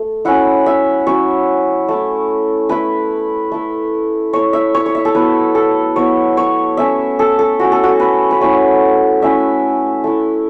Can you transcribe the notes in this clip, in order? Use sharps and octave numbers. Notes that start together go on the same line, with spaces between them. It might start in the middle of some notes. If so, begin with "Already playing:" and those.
Already playing: A3
F#3 C#4 E4 F#5
E5
F#3 C#4 E4 C#5
A3 E4
A3 E4 B4
A3 E4
A3 E4 C#5
E5
C#5
C#5
E5
A4
F#3 B3 E4 B4
A4
F#3 B3 E4 C#5
C#5
A3 C#4 E4 E5
A4
A4
A3 C#4 E4 F#4
A4
F#4
B4
B4
A3 C#4 E4 C#5
A3 C#4 E4 E5
A3 E4